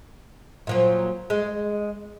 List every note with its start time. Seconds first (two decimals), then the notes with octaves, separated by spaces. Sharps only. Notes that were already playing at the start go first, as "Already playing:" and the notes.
0.67 A#2 F3 F#3
1.30 G#3